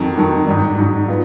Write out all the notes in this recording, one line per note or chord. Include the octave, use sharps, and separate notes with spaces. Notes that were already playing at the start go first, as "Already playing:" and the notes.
Already playing: F2 D#3 F#3
F2 D#3 F#3
G#2 F#3 D4
G#2 F#3 D4
B3 F4